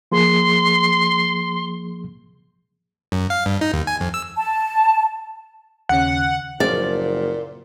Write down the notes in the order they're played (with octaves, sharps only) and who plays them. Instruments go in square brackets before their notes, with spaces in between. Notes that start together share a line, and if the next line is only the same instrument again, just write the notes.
[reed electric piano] F3 A#3 G#4 [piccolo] C6
[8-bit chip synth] F#2
F5
G2
D#4
D#2
G#5
F2
E6
[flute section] A5
[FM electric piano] D#2 C#3 C#4 [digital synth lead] F#5
[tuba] F#1 [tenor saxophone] A#2 [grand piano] F3 C4 C#4 [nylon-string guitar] D5